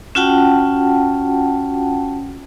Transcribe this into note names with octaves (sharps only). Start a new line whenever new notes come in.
C#4 F4 F#4 F#5 G5 A5